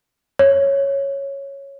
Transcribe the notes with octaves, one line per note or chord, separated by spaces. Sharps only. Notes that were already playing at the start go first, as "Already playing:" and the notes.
C#5